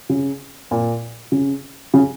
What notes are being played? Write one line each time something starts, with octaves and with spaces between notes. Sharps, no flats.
C#3
A#2
C#3
C#3